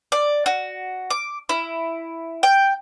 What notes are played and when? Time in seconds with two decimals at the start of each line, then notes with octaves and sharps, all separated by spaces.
0.12 D5
0.46 F#4
1.10 D6
1.49 E4
2.43 G5